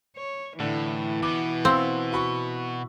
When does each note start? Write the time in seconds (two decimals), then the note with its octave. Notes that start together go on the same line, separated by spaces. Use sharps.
0.17 C#5
0.60 A2 D3 E3
1.23 B2 B3 D6
1.65 C4 F5 C6 E6
2.13 F#4 B5 C#6